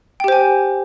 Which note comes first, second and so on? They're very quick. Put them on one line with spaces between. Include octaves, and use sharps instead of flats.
G5 G4 C5 G#5